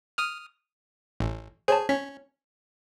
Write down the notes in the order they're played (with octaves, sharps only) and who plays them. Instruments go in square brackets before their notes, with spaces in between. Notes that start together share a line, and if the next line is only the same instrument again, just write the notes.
[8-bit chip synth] D#6 F6
A1
[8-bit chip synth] G#4 [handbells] C5 C#5 A5
[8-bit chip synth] C#4 [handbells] B6